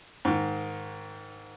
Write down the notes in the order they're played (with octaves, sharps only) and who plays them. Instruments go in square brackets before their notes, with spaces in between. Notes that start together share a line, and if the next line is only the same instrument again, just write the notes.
[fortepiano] G#2 D#3